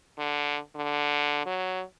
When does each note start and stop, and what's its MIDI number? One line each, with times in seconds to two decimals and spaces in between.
0.18 0.59 50
0.76 1.44 50
1.45 1.82 54